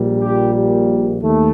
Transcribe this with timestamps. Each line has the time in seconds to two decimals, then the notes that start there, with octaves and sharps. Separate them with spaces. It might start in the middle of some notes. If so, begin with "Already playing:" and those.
Already playing: A#1 A#2 G3
0.19 G4
1.21 D#2 A3